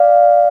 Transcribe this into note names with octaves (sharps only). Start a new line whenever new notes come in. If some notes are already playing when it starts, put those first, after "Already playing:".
Already playing: D5 F5